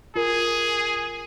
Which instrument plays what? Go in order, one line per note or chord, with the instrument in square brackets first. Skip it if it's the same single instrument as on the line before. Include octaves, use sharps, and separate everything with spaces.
[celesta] F4 A#4 [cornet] G#4